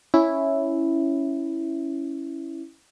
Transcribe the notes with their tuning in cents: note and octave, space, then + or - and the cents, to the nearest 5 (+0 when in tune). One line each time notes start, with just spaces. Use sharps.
C#4 +0 E4 +0